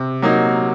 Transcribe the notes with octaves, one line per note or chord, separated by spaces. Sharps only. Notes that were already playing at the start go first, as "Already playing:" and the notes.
Already playing: C3
F#3 A#3 D#4